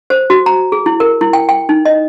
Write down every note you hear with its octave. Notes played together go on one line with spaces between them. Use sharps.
C5
F#4
A#5
G#4
E4
A#4
E4
G5
G5
D#4
D#5